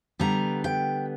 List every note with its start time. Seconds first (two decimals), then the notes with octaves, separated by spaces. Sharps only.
0.19 D3 G3 B3 A#5
0.64 G5